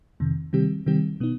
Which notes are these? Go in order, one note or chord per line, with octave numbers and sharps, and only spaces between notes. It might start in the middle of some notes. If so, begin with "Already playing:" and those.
F2 C3 D#3
C3 D#3 G3 C4 G4
C3 D#3 G3 C4 G4
B2 B3 D#4